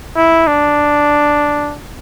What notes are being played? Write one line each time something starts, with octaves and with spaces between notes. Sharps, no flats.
E4
D4